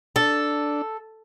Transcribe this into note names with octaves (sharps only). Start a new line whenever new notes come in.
D4 A4